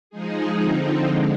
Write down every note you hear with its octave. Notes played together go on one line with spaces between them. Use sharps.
F3 G#3 D#4 G#4
D3 F3 C4 D#4
D3 G#3